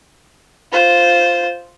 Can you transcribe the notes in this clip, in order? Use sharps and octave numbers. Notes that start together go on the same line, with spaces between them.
F4 C5